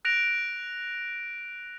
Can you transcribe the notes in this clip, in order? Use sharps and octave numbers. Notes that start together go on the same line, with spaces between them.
F#6 A#6 D7 F7